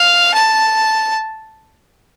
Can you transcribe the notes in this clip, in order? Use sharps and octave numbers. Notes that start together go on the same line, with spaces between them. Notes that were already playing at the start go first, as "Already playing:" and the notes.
Already playing: F5
A5